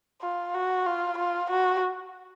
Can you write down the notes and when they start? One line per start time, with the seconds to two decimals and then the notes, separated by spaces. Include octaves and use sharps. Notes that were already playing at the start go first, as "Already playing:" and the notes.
0.22 F4
0.54 F#4
0.86 F4
1.18 F4
1.50 F#4